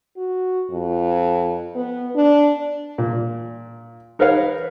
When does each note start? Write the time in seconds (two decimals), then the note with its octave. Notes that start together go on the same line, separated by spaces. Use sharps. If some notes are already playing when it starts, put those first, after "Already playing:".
0.17 F#4
0.71 F2
1.75 B3
2.15 D4
2.98 A#2
4.19 D#4 A#4 B4 C#5 F5